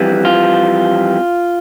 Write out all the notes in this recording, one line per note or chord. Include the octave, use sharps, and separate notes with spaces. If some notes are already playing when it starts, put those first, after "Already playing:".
Already playing: F2 E3 G3
F4